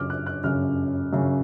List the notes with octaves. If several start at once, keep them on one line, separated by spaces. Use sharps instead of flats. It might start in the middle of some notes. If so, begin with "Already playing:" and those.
Already playing: F#2 C#3 D6 F6
F#6
F#6
F#2 C#3 F6
F#2 C#3